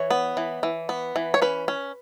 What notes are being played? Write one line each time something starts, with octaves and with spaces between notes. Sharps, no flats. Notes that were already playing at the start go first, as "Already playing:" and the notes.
Already playing: E3 C#5
B3
E3
E3
B3
E3
C#5
C#4 B4
C#4